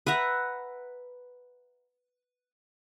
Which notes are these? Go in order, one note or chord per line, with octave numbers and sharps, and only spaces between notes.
B4 E5 F#5 A#5